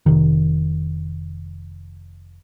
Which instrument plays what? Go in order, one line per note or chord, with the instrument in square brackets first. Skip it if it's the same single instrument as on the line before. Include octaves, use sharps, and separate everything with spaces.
[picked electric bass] F1 C#2 C3 D#3